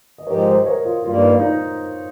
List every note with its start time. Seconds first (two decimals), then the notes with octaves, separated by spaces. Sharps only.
0.18 D#5
0.26 G#2 F3 G#3 D#4 G4 A#4 C#5
0.46 C5 D#5
0.66 A#4 C#5
0.85 F4
1.04 G2 G3 A#3 F4
1.17 D#4
1.40 D#4